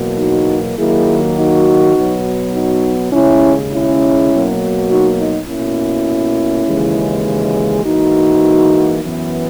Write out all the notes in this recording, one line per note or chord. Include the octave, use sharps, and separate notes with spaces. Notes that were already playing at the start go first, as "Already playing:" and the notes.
Already playing: E2 B2 F#3 A#3
D#4 F#4
D#2 D#3 F#3 A#3 E4 G#4
D#4 F#4
B2 F#3 B3
D#4 F#4
D#2 C#3 G#3 C#4 E4
C#4 E4
B2 F#3 A#3
D#4 F#4
D#4
B2 A#3 C#4 E4
D#2 C#3 E3 G#3
G#2 E3 A#3 D#4 F#4
F#2 E3 B3